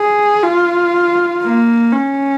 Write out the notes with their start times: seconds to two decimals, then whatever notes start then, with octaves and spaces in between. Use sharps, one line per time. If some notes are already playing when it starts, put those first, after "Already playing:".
Already playing: G#4
0.43 F4
1.43 A#3
1.92 C#4